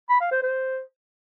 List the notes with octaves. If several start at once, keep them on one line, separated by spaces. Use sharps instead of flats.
B5
F5
C5
C5